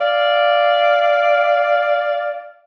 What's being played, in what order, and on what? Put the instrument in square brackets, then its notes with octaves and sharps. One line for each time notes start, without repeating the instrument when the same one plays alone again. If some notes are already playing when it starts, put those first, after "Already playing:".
[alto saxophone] D5 [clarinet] F5